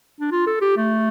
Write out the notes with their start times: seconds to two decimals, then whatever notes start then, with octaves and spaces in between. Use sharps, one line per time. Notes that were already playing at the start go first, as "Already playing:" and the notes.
0.20 D4
0.31 F4
0.47 A4
0.61 G4
0.77 A3